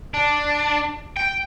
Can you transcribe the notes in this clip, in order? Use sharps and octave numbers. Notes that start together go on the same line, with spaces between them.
D4
G5